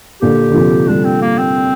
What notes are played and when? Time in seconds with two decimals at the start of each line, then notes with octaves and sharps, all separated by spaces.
0.21 A#2 D3 G4
0.49 D3
0.54 C3 F3
0.88 D3 G3 D4
1.05 C4
1.22 A#3
1.39 C4